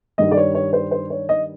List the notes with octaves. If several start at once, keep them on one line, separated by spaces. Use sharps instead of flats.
G2 D#3 G3 D#5
D5
C#5
C#5
C5
C5
C#5
D#5